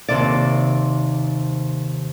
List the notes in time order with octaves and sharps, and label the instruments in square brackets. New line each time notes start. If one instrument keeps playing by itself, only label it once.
[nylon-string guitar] D#2 C3 D5